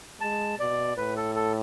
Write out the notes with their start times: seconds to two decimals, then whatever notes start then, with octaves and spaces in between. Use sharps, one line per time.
0.21 G#3 A5
0.58 B2 D5
0.97 A2 B4
1.16 A4
1.35 A4